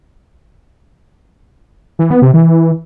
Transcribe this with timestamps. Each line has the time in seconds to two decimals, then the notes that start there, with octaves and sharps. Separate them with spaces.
1.99 E3
2.10 B3
2.22 C3
2.34 E3